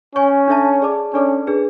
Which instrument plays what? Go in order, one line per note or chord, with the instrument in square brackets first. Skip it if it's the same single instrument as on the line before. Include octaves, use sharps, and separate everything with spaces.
[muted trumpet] C#4 [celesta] C#5 G#5 C#6
[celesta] D4 A4 C#5 E5 A5
G#4 D5 A5 D6
[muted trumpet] C#4 [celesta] D4 A4 D5 A5 D6
[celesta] D4 G#4 B4